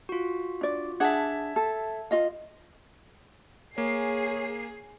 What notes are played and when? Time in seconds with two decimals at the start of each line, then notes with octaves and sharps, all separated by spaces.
0.09 F4 F#4
0.61 D4 D5
1.00 D4 G#4 E5 F#5 A5 G#6
1.56 A4
2.11 F4 D#5 F5
3.78 A#3 G#4 C#5 C7